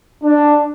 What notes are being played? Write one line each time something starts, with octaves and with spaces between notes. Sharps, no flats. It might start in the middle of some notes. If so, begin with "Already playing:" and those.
D4